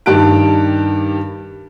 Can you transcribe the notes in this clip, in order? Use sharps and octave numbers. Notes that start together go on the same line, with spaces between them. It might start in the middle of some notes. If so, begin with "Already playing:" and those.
G2 D#3 G4 A5 F#6 D7